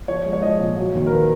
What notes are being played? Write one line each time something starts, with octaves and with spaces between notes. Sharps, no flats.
F3 C#5
G#3
C#5
F3 D#5
A#2
F#3 C#5
D#2
A#4
D#3 B4